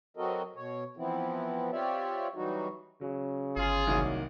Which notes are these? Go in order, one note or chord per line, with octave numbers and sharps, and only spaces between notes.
F#3 C4 F#4 A4 A#4 D#5
B2 C#5
E3 F3 B3 C4 E4
C4 F4 G4 C#5 D5 E5
E3 F#3 G3 D#4 F#4
C#3 F#3
G1 F4 G#4
C2 D#3 F#3 A#3